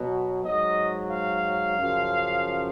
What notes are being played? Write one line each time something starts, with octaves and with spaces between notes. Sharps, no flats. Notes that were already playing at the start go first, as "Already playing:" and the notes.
Already playing: B2 F#3
G#2 F#3 D#5
F5
F#2 C#3 F3